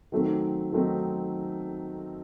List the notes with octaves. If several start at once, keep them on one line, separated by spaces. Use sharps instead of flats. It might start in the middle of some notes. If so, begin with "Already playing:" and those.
D#3 F#3 A3 C4 D#4
D#3 F#3 A3 C4 D#4